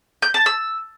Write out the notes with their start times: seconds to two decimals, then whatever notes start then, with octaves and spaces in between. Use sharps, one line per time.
0.22 G6
0.34 A5
0.46 E6